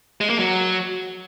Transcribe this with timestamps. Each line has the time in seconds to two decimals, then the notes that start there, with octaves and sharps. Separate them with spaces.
0.21 G#3
0.30 A#3
0.38 F#3